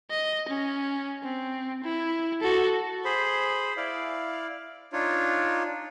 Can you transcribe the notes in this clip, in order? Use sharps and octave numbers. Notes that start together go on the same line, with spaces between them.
D#5
C#4
C4
E4
F#4 A4
G#4 C5 B5
E4 D5 F5
D4 D#4 F4 C#5